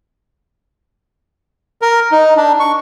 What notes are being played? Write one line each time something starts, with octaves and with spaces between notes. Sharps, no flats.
A#4
D#4
D4
C#6